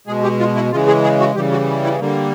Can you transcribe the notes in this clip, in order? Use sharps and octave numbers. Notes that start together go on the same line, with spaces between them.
B2 G#3 G#4
G4
F4
E4
C#3 E3 G#3 F4
G#4
G#4
F#4
C#3 E3 G3 G4
F#4
E4
D3 G3 A#3